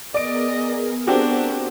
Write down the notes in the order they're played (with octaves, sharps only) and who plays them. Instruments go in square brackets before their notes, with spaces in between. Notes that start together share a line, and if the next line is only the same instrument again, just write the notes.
[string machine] B3 G#4 A#4 [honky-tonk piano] D5 D7 [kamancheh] D#5
[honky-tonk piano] C4 F#4 G4 [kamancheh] D4